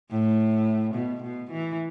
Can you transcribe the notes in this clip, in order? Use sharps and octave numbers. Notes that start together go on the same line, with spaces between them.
A2
B2
B2
E3